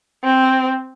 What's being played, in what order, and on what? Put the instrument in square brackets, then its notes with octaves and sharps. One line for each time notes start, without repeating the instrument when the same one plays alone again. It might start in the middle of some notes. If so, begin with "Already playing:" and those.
[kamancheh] C4